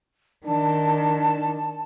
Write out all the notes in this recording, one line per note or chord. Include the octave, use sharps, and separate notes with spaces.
D#3 D4 A5